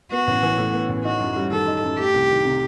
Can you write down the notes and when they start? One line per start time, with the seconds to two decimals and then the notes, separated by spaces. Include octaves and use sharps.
0.11 B3 F#4
0.27 A1
0.42 E3
0.58 A2
0.73 B3
0.89 A1
1.04 D#4 F#4
1.20 F#2
1.36 G3
1.51 D#3 A4
1.67 D#4
1.83 F#2
1.98 A3 G4
2.14 C2
2.29 D#3
2.45 C3